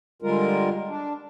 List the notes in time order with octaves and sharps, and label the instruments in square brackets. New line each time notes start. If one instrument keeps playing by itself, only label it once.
[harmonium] D3 G3 G#3 F4 A#4
D4